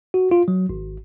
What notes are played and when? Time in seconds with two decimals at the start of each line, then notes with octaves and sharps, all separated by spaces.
0.14 F#4
0.31 F4
0.48 F#3
0.69 G#1